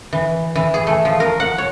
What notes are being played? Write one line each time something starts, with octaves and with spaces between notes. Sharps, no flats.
E3
E3
G#4
A3
F3
A#4
F#5
C#5